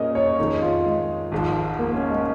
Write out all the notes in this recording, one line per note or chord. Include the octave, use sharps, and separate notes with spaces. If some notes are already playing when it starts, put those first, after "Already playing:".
Already playing: A#2 A#3 C#4 G#4 A#4 D#5
C#5
F2 D#3 G#3 D#4
F4
G#3
G#1 G#2 F3
A#3
C#4
G#3